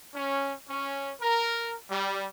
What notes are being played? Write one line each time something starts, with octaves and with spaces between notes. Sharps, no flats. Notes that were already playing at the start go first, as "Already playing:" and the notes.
C#4
C#4
A#4
G3